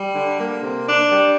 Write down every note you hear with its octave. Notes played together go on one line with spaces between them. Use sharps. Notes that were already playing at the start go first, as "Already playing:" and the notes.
Already playing: G3
D3
A#3
C3
D4
G3